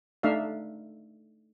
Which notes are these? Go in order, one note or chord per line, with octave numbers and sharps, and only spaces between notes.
A3 D4 D#4 E5 F5